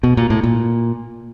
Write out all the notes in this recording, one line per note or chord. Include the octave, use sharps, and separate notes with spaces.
B2
A#2
A2
A#2